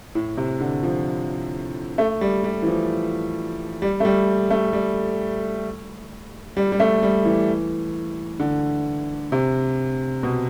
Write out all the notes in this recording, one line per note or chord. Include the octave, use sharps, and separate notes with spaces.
A2
C3
D3
F3
A3
G3
G3
E3
F3
G3
A3
G3
A3
G3
G3
G3
A3
G3
E3
D3
C3
B2